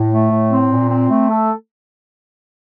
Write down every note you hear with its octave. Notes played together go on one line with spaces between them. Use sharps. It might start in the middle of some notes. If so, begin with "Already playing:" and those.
Already playing: A2
A3
A2
C4
A#2
C4
A3
A4